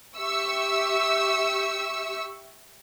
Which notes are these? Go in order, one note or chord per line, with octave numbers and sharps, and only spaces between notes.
G4 E5 C#6 E6